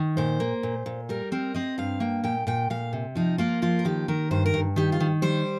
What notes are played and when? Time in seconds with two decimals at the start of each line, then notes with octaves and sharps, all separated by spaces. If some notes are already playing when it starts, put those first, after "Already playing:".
Already playing: D#3
0.17 A#2 C5
0.40 A#3
0.63 A#2
0.86 A#2
1.09 G3 A#4
1.32 C4 A#4
1.54 C4 D#5
1.78 G2 F5
2.00 A#3 G5
2.24 A#2 G5
2.47 A#2 G5
2.70 A#2 F5
2.93 C3
3.15 F3 D#4
3.38 A#3 F4
3.62 F3 F4
3.79 A#4
3.85 D#3 G4
4.08 D#3 A#4
4.31 G2 C5
4.46 A#4
4.54 G2
4.76 D#3 G4
4.92 F4
5.00 D#3
5.22 G3 C5